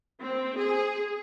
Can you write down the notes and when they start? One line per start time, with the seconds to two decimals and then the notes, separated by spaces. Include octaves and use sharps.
0.19 C4
0.57 G#4